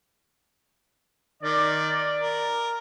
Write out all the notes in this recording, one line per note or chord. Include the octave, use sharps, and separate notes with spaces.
D#3 D5
A#4